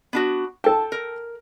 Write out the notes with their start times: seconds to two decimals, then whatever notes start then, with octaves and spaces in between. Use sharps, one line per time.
0.13 B3 D4 F#4
0.64 A4 G5 A5
0.92 A#4